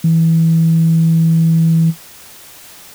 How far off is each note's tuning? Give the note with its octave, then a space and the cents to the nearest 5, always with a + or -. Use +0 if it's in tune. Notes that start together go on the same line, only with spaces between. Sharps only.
E3 -15